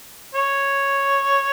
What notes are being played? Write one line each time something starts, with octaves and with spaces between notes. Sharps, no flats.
C#5